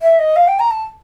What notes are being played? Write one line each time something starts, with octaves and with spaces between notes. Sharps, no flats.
E5
D#5
F5
G5
A#5
A5